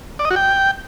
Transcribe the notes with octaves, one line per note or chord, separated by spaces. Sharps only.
D5
D#5
F#4
G5